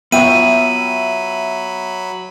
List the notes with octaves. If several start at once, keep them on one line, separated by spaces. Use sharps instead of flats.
F#3 B3 F4 C#5 E5 G5 B5 D#7